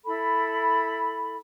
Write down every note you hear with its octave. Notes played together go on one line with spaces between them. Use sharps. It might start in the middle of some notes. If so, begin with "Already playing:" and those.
E4 A4 B5